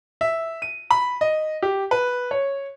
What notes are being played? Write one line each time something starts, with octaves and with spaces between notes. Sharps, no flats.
E5
D#7
B5
D#5
G4
B4
C#5